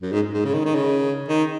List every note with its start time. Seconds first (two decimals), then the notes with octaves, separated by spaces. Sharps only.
0.02 F#2
0.12 G#2
0.34 G#2
0.45 C#3
0.54 D#3
0.65 D#3
0.75 C#3
1.29 D#3